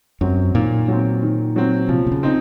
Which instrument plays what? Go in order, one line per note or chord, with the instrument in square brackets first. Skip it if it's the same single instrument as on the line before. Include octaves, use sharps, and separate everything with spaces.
[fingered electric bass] F#2 [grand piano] F#3 C4
[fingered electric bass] A#2 [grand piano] D#3
[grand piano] F#3 C4
D#3
F#3 C4
[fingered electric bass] C3 [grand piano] F3
[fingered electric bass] C3
C#3
[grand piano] C4 D#4